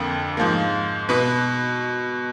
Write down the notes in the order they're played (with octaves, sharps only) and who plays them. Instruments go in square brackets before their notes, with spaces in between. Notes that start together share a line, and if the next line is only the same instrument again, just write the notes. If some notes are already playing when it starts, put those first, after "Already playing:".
Already playing: [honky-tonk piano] F2 D3 F3 A#3
G#2 F3 A#3
B2 B4